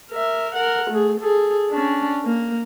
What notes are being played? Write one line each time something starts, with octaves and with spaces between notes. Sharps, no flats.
A#4 E5
A#4 F#5
A3 G#4
G#4 A4
C#4 D4
A#3